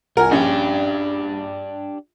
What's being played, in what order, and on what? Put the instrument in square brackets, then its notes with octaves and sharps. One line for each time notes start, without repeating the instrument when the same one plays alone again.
[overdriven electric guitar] C2 [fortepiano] A#4 F#5 G#5
[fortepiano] A#1 C#4 [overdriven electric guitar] D4 G4